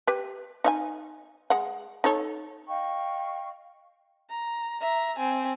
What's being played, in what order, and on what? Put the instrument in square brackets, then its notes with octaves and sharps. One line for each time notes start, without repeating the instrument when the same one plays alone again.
[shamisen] G4 B4
D#4 E5 G#5
G#3 F#5
D#4 A4 C#5
[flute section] D#5 F5 G5 C#6
[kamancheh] A#5
E5 A#5
C4 G#5